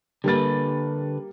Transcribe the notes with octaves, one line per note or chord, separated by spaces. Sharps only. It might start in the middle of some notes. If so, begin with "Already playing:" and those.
D3 G3 A#3 B4 A6